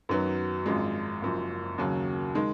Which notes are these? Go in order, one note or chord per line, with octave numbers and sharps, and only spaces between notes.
F#2 D#3 F#3 B3
G#1 F#2 F3 G#3
F#1 F#2 F3
D#2 C#3 F#3
D#3 G#3